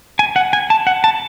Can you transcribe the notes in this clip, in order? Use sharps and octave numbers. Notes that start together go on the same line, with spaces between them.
G#5
F#5
G#5
A5
F#5
A5